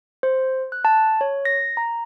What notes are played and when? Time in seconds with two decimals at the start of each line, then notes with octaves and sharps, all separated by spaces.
0.23 C5
0.72 F#6
0.85 A5
1.21 C#5
1.45 A#6
1.77 A#5